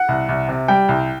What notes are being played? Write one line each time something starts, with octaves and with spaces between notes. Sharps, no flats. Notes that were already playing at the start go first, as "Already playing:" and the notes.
Already playing: F#5
C2
C2
C3
G3 G5
C2